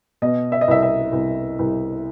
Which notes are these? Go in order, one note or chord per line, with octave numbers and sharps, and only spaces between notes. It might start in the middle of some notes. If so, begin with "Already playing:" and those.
B2 D#5
E5
D#5
C2 E5
E5
C2
C2